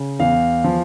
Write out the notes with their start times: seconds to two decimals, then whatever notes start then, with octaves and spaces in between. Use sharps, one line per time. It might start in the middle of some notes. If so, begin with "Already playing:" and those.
Already playing: C#3
0.19 E2 F5
0.64 F3